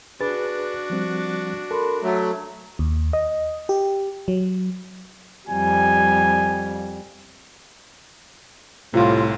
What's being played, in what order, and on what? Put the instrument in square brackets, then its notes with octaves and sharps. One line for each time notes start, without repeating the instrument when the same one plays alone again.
[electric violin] D4 F#4 [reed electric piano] G#4 B4 A6
[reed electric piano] F3 G3 C4
[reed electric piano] A4 [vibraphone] A#4 B5 C6
[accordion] F#3 A3 [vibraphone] A#5
[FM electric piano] D#2
D#5
G4
F#3
[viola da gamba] F2 G3 [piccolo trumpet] G#5
[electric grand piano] C2 C3 [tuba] A2 [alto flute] F4